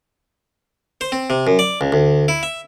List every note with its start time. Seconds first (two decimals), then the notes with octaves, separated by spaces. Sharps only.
1.01 C5
1.12 C4
1.30 C3
1.47 F#2
1.59 D5
1.81 C#2
1.92 D2
2.28 E4
2.43 E5